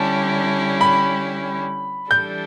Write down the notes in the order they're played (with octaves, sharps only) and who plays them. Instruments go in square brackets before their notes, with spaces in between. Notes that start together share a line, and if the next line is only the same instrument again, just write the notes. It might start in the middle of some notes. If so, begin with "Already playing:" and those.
Already playing: [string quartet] D3 G3 C#4 E4 G4 [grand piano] A5
[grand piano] B5
[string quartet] E3 G3 D4 A4 [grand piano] G6